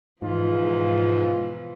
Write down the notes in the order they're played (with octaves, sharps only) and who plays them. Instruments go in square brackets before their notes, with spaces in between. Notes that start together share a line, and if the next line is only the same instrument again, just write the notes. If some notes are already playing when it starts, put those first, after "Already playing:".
[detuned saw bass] G#2 [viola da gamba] B2 E3 F3 [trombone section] F4